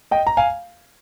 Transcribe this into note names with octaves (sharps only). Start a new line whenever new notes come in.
D#5 G5
A#5
F5 G#5